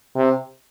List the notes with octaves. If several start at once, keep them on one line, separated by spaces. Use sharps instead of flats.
C3